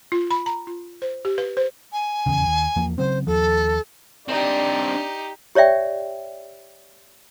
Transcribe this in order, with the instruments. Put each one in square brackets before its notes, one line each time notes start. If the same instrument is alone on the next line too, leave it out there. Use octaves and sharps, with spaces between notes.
[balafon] F4
B5
A#5
F4
C5
G4
B4
C5
[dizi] G#5
[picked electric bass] D#1 E2 C#3
D#2
E2 F3 A#3
[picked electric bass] C#3 F#3 C4 [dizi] C5
[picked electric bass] D#2 F3 [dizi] A4
[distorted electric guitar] C4 D4 [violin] D#4 G4 [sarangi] D5
[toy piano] G4 C#5 D5 E5 G5